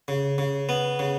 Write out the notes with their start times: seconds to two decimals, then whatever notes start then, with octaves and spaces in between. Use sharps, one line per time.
0.08 C#3
0.38 C#3
0.69 B3
0.99 C#3